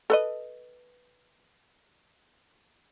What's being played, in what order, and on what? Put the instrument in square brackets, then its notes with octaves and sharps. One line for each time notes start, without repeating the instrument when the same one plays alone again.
[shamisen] A4 B4 D#5